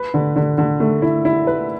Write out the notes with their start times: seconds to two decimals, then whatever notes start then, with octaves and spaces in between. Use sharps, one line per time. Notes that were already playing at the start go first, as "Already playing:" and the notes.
Already playing: B4
0.14 D3
0.36 D3
0.58 D3
0.80 A3
1.02 E4
1.25 E4
1.47 B4